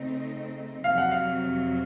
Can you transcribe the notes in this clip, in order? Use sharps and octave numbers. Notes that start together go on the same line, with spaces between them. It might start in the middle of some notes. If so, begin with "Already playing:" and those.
Already playing: C#3 A3 C4 D#4
F2 C3 F#3 F5
F#5
F5